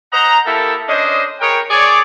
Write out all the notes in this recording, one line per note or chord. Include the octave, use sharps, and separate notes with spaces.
C5 D#5 F#5 A#5
A#3 E4 G4 A4
C#4 D4 C5 D#5
G#4 A#4 B4 C#5 G5
G#4 C#5 D5